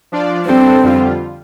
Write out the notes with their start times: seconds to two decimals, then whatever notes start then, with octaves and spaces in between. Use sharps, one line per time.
0.12 F3 D4 F4 D5
0.47 G2 G3 C4 D4 A4 C5
0.83 F2 D3 G3 F4